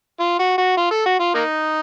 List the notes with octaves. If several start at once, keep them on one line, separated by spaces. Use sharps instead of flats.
F4
F#4
F#4
F4
A4
F#4
F4
A#3 D#4